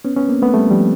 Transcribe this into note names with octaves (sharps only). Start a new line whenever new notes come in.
B3 C#4
B3 C#4
A#3 C4
A3 B3
G3 A3
F3 G3